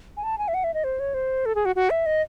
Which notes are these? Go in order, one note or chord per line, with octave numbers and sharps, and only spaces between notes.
G#5
A5
G#5
E5
F#5
E5
D#5
C5
C#5
C5
A4
G#4
F#4
F#4
E5
D#5